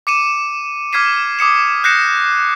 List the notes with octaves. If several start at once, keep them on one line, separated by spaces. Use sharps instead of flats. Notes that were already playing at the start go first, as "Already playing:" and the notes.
D6 C#7 D#7 E7
D6 F6 G#6 B6 C7 D#7
D6 D#6 C#7 E7
F#6 G6 A#6 C7 C#7 E7